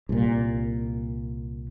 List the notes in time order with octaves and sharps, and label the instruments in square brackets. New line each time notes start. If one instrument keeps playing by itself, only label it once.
[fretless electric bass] C2 A#2